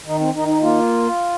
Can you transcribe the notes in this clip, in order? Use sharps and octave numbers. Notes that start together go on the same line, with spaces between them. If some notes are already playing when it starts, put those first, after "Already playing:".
D#3 D#4
C4
D#3 D#4
D#4
A#3 F4